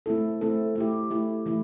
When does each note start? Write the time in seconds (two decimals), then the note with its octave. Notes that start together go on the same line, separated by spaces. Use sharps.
0.06 A3 C4 E4 A4
0.41 A3 C4 E4 A4
0.75 A3 E4 G4
1.10 A3 E4 G4
1.46 E3 A3 E4